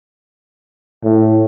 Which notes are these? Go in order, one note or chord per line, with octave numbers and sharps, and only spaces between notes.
A2